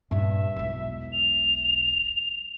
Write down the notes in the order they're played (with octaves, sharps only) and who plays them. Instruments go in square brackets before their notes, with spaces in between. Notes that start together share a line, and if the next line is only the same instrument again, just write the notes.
[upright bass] G2 A#2 [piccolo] E5
[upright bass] E1 B1
[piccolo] F7